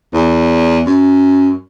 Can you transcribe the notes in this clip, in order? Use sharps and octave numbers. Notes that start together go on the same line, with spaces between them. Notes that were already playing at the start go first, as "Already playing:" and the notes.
E2
F#2